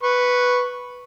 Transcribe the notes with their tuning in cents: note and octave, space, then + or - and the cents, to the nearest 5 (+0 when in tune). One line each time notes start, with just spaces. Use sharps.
B4 +0 C#6 -5